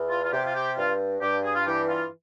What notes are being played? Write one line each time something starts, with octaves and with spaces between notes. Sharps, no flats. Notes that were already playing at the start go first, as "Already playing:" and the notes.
Already playing: E2
F4
F4
C3 G4
F4
G4
G2 F4
G2 G4
G#4
F4
E3 G4
F4